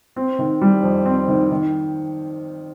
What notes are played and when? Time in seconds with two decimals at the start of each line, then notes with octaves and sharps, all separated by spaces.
0.16 C4
0.39 D#3
0.61 G3
0.83 F2
1.06 C4
1.28 D#3
1.51 D#3